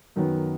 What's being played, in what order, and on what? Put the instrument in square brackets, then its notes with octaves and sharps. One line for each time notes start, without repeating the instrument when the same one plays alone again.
[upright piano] F#2 D#3 F#3 B3